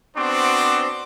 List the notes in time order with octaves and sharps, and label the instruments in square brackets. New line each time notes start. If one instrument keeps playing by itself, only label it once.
[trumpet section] B3 C4 D4 F#4 C5 D6